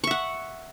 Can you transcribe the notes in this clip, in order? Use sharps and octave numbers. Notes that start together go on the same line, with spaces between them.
E5 F#5 C#6